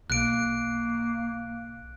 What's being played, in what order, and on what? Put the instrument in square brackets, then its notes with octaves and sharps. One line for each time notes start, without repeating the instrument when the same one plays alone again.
[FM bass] B1 [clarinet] A#3 [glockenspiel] F#6 D7